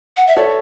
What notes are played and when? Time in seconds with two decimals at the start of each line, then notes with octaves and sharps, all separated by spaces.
0.17 F#5
0.27 E5
0.36 A4 C#5 D5